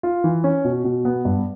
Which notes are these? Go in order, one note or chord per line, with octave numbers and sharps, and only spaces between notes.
F4
E3
C#4
B2
B2
B3
G2